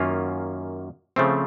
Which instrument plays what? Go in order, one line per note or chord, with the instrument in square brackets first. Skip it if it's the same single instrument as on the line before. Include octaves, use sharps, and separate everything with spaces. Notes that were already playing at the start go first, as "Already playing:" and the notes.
Already playing: [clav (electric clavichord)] F#2 D#3 A#3 C#4 F4
C#3 F3 A3 C4